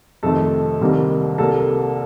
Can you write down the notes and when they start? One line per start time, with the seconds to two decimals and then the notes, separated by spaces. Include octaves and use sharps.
0.23 F2 C3 D#3 A3 A4
0.81 C2 C3 D#3 G3 A#3
1.38 C2 C3 G3 A#3 A4